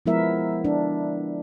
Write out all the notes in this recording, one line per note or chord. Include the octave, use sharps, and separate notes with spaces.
F3 G#3 B3 E4 A#4 E5
D4